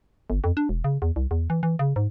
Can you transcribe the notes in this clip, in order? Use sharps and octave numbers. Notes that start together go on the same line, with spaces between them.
G1
F2
D4
E1
C#3
E2
C2
E2
E3
E3
C#3
G#2